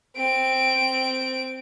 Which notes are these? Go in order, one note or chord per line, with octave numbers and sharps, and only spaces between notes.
C4 D7